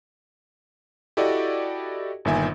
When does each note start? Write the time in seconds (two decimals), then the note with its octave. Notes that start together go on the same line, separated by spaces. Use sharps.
1.17 E4 F#4 G4 A4 D5 D#5
2.25 G1 A#2 D#3 E5 G#5